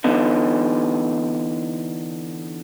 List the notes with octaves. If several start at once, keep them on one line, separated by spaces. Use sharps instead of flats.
E2 D3 B3 D#4